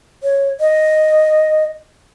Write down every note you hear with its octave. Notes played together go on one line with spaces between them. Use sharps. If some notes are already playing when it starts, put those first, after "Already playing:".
C#5
D#5